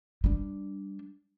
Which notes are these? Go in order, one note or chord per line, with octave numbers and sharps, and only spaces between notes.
G3 D4